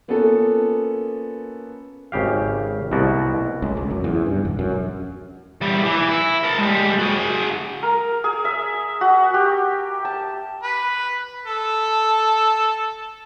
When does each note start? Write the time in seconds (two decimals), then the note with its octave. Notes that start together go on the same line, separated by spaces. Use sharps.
0.08 A#3 B3 C#4 F4 A4
2.12 G#1 C#3 G4 F5
2.92 C2 B2 F#4 D5
3.62 C#2
3.77 C#2
3.91 F#2
4.04 E2
4.26 G2
4.45 E1
4.59 F#2
5.61 E2 G3
5.85 E3
6.08 E4
6.43 A#4 A5
6.58 G3 G#3
6.99 F#4 G#4
7.83 A#4
8.24 G#4
8.45 E5
9.01 F#4
9.34 G4
10.05 A5
10.64 B4
11.46 A4